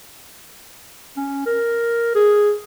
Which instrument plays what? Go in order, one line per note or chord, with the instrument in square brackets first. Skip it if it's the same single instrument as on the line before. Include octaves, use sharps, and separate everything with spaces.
[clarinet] C#4
A#4
G#4